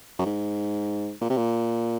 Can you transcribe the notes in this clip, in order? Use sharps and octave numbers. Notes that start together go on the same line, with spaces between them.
F#2
G#2
A#2
C3
A#2